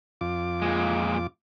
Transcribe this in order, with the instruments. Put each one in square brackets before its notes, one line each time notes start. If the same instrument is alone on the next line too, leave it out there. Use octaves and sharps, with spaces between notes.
[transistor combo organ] F2 F4 D6
[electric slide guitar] A#2 G#3